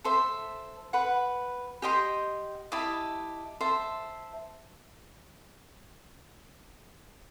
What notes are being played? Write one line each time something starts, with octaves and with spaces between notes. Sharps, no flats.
A4 C5 E5
B4 F#5 B5
G4 D#5 G5 C6
E4 G4 D#5 A5
C5 E5 A5